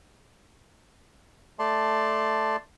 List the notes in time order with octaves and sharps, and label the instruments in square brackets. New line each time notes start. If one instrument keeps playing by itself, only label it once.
[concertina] A3 D5 A5 C6